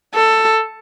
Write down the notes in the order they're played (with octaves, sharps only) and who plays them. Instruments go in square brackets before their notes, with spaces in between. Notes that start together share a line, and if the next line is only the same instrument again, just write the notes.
[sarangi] A4